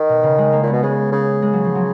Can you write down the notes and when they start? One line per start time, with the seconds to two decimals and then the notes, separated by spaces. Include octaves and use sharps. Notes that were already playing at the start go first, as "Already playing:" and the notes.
Already playing: D#3
0.09 B2
0.23 C#3
0.38 G#3
0.53 A#3
0.63 A#2 B3
0.73 B2
0.83 C#3 G#3
1.12 C#3
1.42 G#3
1.53 F#3
1.64 F3
1.75 F#3